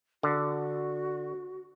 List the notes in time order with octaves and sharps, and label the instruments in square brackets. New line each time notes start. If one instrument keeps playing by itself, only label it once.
[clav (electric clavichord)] D3 [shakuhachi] F#4